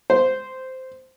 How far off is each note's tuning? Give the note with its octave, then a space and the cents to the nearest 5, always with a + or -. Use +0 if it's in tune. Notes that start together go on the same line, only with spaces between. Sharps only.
C5 -10